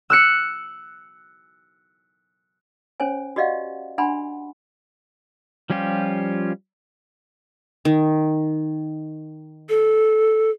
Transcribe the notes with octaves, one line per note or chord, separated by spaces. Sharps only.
E6 F#6 C#7
C#4 C5 C#5 G#5
F#4 G4 D5 D#5 F5 F#5
D4 F#5 G#5 B5 C6
F3 G3 C#4 F4 G4
D#3
A4